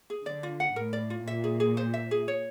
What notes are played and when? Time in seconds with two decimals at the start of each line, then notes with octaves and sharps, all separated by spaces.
0.10 G#4
0.26 D3 D5
0.43 F4
0.60 F#5
0.76 A2 A#4
0.93 D5
1.10 F4
1.27 A#2 E5
1.44 G#4
1.60 G#4
1.77 C5
1.94 E5
2.11 G#4
2.28 C#5